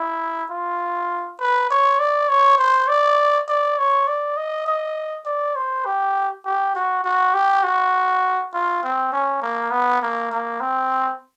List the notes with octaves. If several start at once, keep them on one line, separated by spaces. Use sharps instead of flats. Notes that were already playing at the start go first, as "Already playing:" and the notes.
Already playing: E4
F4
B4
C#5
D5
C#5
C5
D5
D5
C#5
D5
D#5
D#5
D5
C5
G4
G4
F#4
F#4
G4
F#4
F4
C4
C#4
A#3
B3
A#3
A#3
C4